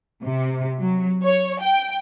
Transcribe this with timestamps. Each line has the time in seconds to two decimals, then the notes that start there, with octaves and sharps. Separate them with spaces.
0.22 C3
0.79 F#3
1.25 C#5
1.61 G5